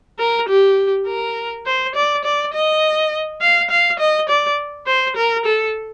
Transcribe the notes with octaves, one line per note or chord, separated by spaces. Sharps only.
A#4
G4
A#4
C5
D5
D5
D#5
F5
F5
D#5
D5
C5
A#4
A4